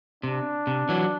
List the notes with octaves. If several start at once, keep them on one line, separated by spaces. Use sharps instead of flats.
C3 D4
C3
E3 F#3